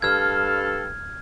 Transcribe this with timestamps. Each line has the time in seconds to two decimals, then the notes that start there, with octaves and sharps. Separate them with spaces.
0.02 G2 A4 F5 F6 G#6